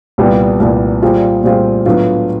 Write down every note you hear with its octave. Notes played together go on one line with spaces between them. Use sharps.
C2 A#2 G3 B3
C2 A#2 G3 B3
A#2 G3 C4 F4 G#4
A#2 G3 C4 F4 G#4
A2 F#3 B3 D4 F4